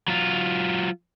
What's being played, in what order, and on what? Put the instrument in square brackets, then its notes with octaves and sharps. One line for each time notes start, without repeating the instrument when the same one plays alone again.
[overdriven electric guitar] F#3 F4